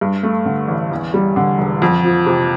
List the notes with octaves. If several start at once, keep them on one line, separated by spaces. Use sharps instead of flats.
G2
A3
D3
A1
E2
G3
D3
E1
F2
F3
C3